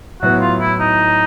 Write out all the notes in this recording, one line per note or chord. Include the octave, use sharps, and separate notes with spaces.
A2 F#3 B3 F#4
F4
E4
D#4